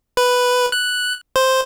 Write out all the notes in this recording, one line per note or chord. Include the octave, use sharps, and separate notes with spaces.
B4
F#6
C5